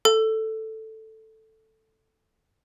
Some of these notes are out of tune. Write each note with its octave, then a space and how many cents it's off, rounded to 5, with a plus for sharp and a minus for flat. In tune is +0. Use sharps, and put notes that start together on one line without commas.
A4 +5